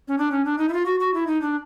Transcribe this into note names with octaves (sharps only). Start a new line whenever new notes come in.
C#4
D4
C#4
D4
D#4
E4
F4
F#4
F#4
E4
D#4
D4